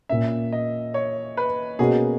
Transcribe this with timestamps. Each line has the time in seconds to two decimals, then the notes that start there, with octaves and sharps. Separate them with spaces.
0.09 A#2 A#3 C#4 E5
0.52 D#5
0.94 C#5
1.37 B4
1.79 B2 A#3 C#4 F#4 G#4